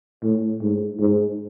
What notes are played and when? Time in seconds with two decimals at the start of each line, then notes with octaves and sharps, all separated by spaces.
0.23 A2
0.61 G#2
0.99 G#2